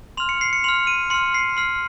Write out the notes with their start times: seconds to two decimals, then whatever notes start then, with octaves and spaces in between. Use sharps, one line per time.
0.17 C6 F6 F7
0.29 C#7
0.41 C7
0.53 C#7
0.64 C6 F6 F7
0.87 D#7
1.10 C6 F6 C#7
1.34 C7
1.57 C6 F6 C7